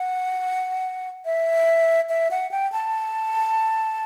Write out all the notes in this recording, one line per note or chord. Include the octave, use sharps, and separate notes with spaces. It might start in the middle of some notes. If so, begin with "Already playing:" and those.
Already playing: F#5
E5
E5
F#5
G5
A5